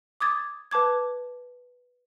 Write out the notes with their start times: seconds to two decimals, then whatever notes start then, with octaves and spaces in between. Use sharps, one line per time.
0.20 D6 D#6 G#6 A6
0.71 B4 A5 D6 G#6